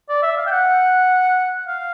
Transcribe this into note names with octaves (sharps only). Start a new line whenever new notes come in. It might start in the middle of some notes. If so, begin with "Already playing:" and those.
D5
E5
F5
G5
F#5
F5